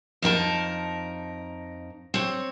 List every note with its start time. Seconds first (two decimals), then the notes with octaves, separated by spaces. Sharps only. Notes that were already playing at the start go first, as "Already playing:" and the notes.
0.22 F2 D#4 A#4 A5
2.14 C4 C#5